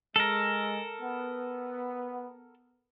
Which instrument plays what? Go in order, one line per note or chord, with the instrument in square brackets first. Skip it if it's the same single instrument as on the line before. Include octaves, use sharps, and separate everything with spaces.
[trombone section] G#3 [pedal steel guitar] A4 A#4
[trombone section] B3